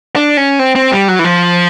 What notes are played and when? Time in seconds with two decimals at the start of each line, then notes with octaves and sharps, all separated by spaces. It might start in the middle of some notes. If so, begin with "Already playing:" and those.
0.16 D4
0.37 C#4
0.59 C4
0.75 C4
0.92 G3
1.08 F#3
1.19 E3
1.24 F3